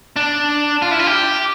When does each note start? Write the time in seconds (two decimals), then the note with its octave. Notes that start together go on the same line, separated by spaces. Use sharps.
0.16 D4
0.82 F4
0.91 E4
0.99 F4
1.07 G4